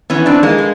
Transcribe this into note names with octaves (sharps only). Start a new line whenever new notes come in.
E3 B3 C#4
C4 D4
E3
G#3 A#3
G#3